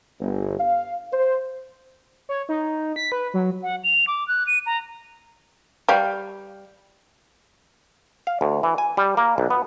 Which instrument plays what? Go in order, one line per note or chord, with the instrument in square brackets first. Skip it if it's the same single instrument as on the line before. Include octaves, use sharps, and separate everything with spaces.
[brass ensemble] G1
F5
C5
[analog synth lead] C#5
D#4
B6
B4
F#3
[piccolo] F#5
F7
D6
F#6
D#7
A#5
[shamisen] G3 F5
[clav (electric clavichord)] F5
D2
E3
G#5
G3
A#3
B1
B3